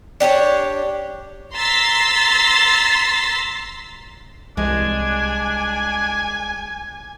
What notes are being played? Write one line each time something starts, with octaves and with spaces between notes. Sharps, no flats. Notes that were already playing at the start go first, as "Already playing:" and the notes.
D4 G4 C5 C#5
A#5 C6 E6 A6 B6 C7
C2 G#3 D4 G#5